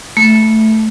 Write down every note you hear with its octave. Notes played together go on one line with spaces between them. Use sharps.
A3